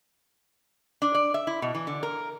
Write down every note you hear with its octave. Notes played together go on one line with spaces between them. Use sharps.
D4
D5
E5
E4
B2
E3
D3
A#4